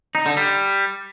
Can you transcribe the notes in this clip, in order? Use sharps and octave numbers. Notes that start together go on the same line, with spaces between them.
D#4
D3
G3